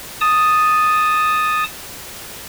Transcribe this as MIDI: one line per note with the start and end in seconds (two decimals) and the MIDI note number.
0.21 1.64 81
0.21 1.64 87